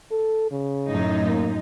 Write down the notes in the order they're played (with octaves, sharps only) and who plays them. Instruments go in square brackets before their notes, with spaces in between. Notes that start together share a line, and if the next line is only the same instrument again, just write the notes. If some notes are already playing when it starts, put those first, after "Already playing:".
[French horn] A4
C#3
[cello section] F#2 A2 D#4
[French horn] A#3